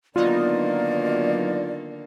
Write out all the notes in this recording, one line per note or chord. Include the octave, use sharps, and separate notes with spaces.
D3 D#3 F#3 A#3 B3 D#4 F4 D5